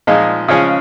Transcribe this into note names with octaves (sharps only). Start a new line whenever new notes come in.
A#2 F3 G#3 D#4
C#3 F3 G#3 C#4 G#4